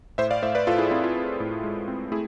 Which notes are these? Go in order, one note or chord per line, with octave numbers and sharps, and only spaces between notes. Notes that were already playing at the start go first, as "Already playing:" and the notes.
A2 C5 E5
D5 F5
A2 C5 E5
B4 D5
A2 F4 A4
E4 G#4
C4 E4
F4
C4
A2
G#3
C4
A3 E4 G#4